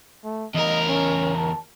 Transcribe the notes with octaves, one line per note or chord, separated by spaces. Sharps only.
A3
E2 A#4 D#5
C#4
A5